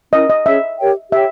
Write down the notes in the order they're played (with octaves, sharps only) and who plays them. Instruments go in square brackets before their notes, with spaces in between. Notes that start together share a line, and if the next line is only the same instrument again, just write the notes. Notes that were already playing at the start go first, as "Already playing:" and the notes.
[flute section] C#4 E4 A#4 [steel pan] D#5
[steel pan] D#5
[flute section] C#4 G#4 C#5 [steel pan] E5
[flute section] G4 A#4 C#5 G5
[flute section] G4 C#5 G5 [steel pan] E5